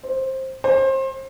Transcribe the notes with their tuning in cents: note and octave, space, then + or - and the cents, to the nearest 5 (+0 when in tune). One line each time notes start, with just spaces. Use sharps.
C5 +15
C5 +30